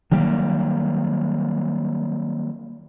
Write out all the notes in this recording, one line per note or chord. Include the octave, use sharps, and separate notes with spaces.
D#3 F#3 G3 A#3